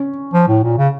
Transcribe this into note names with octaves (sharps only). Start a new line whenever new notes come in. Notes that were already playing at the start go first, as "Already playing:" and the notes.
Already playing: C#4
F3
A2
A#2
C#3